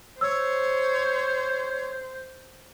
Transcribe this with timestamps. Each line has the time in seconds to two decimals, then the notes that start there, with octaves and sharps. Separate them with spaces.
0.21 C5 C#5 E6